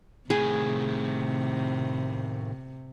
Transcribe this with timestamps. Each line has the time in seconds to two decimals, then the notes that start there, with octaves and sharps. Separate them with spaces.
0.30 A2 C3 D#3 G#4